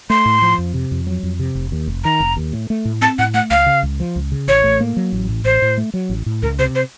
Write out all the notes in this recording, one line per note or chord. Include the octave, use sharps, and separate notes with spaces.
A3 C6
A2
F3
F2
C3
F2
F#3
F2
C3
F1
D#2
F1
D#3 A#5
F1
D#2
A2
A3
A2
C4 A5
A2 F#5
A3 F#5
C#2 F5
C#3
C#2
F3
C#2
C#3
A1 C#5
A2
A#3
F#3
A1
A2
A1 C5
A2
A3
F#3
A1
A2
C#2 A#4
C3 C5
C5